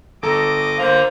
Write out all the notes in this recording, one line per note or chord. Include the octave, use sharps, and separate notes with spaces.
G1 A4 D#5 A#5 D6
D3 A#3 F4 C5 A#5